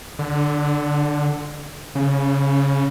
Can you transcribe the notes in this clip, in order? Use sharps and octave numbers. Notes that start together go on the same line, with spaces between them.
D3
C#3